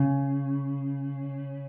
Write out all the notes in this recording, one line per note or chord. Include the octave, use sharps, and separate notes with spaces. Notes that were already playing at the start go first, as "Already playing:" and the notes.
Already playing: C#3